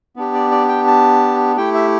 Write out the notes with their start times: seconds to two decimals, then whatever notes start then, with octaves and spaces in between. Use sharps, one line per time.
0.16 B3 D4 G4
0.34 D5
0.51 D5
0.69 G5
0.87 A5
1.57 A3 E4 G4 G5
1.74 E5